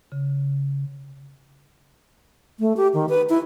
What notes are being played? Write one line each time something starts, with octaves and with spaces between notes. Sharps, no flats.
C#3
A3
G4
D#3
B4
E4